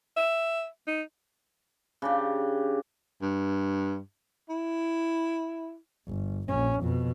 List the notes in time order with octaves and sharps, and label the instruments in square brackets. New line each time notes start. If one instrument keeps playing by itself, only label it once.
[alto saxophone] E5
D#4
[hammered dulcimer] C#3 D4 G4
[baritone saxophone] G2
E4
[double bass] G1
A#1 C#4
F2 B2